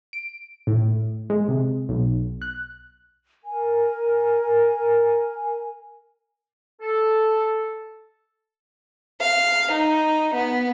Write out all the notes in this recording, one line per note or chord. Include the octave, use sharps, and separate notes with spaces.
D7
A2
G#3
C3
B1
F#6
A#4 G#5
A4
F5
D#4
B3